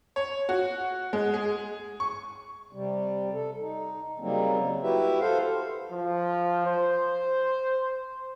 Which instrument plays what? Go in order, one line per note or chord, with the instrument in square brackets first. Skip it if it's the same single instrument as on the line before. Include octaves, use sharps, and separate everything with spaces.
[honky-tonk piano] C#5
F#4
G#3
G#4
C#6
[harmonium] C3 G3
A4
D#4
C#3 F#3 G3 A#3 C4 D#4
E4 F#4 G4 B4 E5
A4 C5 F5
[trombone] F3
C5